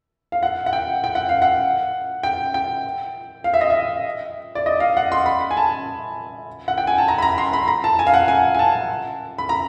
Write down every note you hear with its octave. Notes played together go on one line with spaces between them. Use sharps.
F5
F#5
F#5
G5
G5
F#5
F5
F#5
G5
G5
F5
E5
D#5
E5
D5
D#5
F5
F#5
C6
B5
G#5
A5
F#5
G5
G#5
A5
A#5
B5
A#5
C6
B5
A#5
A5
G#5
F5
F#5
G#5
G#5
A5
B5
A#5